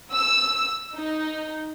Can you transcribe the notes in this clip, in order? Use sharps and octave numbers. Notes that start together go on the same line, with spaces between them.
E6
D#4